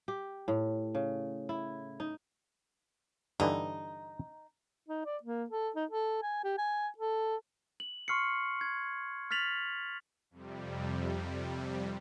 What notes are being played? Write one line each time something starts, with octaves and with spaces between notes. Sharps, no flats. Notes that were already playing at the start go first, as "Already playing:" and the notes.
G4
A2
C#3
E4
D#4
G2 D3 E3 D#4
D#4
D5
A#3
A4
D#4
A4
G#5
G4
G#5
A4
F#7
C6 C#6 F6 C7 C#7
G#6
F6 A6 B6 F7 F#7
F2 C3 G3